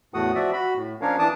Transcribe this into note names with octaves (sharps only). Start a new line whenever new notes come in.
E2 A2 A3 F#4 F#5 D#6
F3 F#4 D5 E5
F#4 B5
A2
F3 C#4 D4 A#4 C#5 F5
E3 D4 A5 D6 D#6